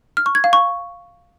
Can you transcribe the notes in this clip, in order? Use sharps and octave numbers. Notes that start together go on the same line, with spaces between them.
F6
C#6
G#6
F5
C#6